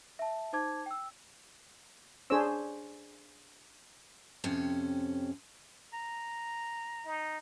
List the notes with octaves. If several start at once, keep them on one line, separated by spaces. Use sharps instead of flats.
E5 A5
D#4 C5 A5 D6 G#6
G5 E6
D4 G#4 A4 C5 C#5 E6
F2 C3 C#4
A#5
D#4